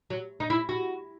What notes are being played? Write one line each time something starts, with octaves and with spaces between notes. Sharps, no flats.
F#3
D#4
E4
F#4